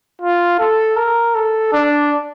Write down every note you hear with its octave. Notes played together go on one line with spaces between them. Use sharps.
F4
A4
A#4
A4
D4